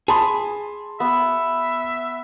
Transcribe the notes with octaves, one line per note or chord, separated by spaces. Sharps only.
G#4 A5 B5 C6
B3 E5